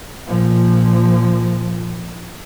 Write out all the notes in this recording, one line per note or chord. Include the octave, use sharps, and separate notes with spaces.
A#2 F3